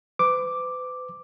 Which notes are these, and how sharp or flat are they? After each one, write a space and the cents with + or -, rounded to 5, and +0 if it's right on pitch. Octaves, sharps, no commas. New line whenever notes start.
B4 +40 D6 +0